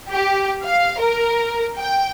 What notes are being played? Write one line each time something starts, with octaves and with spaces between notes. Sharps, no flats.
G4
F5
A#4
G5